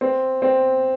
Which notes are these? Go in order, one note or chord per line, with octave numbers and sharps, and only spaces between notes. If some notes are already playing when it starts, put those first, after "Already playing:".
C4
C4